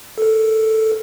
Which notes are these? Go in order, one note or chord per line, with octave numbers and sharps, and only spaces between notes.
A4 A#4